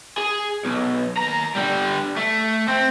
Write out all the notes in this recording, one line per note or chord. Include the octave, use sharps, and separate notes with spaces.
G#4
B1
D#2 A#5
D3 G3
A3
C4